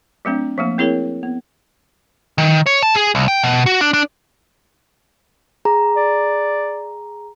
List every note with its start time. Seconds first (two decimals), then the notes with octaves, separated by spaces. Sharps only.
0.25 F#3 A3 C4 D4
0.58 F3 A3 A#3
0.78 C4 E4 G#4 A#4 C#5
1.23 B3
2.38 D#3
2.66 C#5
2.83 A5
2.95 G#4
3.15 C2
3.28 G5
3.44 B2
3.66 F#4
3.81 D4
3.94 D4
5.65 G#4 A#5
5.96 D5